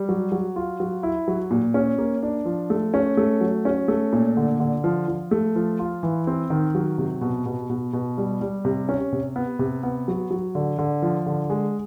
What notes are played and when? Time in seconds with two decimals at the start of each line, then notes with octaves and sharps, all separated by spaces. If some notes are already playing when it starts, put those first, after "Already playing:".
Already playing: G3
0.09 F#3
0.32 F#3
0.56 F4
0.80 F#3
1.03 E4
1.28 F#3
1.51 A#2
1.74 C#4
1.98 A#3
2.23 D4
2.45 F3
2.70 A3
2.94 C#4
3.17 A3
3.41 F#3
3.65 C#4
3.88 A3
4.13 A#2
4.37 D3
4.60 D3
4.84 F3
5.08 F3
5.31 A3
5.56 F3
5.79 F4
6.03 E3
6.27 C4
6.50 D#3
6.75 F#3
6.98 C3
7.21 B2
7.46 B2
7.70 B2
7.93 B2
8.18 G3
8.41 G3
8.65 C3
8.89 C#4
9.12 C3
9.36 B3
9.59 C3
9.83 B3
10.08 F#3
10.31 F#3
10.55 D3
10.78 D3
11.02 F3
11.26 D3
11.50 G#3